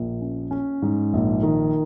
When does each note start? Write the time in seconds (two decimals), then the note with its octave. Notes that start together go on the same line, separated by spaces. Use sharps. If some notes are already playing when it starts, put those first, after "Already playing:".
Already playing: A#1
0.21 C#4
0.51 C#4
0.82 G#2
1.13 A#1
1.43 D#3